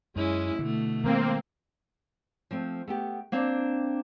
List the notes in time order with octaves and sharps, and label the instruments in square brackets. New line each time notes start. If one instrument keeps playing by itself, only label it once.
[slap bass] F#2 [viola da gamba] G#3 C#4 E4
[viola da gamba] B2 A3 [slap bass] D3
[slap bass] D#3 G3 G#3 [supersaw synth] A#3 C4
[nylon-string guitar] F3 A3 C4
A3 B3 G4
A#3 C4 D4